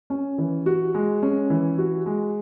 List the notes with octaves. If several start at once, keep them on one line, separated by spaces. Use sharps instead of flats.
C#4
E3
F#4
G#3
C#4
E3
F#4
G#3